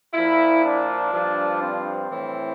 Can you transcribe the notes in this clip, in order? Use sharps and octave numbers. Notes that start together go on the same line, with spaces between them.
A#2 F3 E4
D4
G2 F3
C4
A2 E3